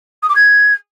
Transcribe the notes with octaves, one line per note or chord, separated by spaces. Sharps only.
D#6
D6
G#6